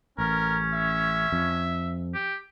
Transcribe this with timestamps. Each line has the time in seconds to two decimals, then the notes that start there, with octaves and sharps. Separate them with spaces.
0.18 A1 C#4 A#4
0.74 E5
1.32 F2
2.15 G4